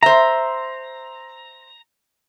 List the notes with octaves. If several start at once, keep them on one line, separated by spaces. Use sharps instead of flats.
C5 E5 A#5